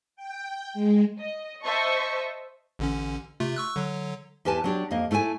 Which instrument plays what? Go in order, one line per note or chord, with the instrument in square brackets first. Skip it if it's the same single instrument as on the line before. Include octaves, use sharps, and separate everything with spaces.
[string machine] G5
G#3
[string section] D#5
C5 D#5 E5 A5 C#6
[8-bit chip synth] A1 D3 C#4
C3 A3 F4
C#6 E6 F#6
D3 F#3
[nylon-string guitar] E2 G4 B4 G#5 A5
F#3 D4 G4
F2 A#3 D#5
A3 E4 A4 A#4 G#5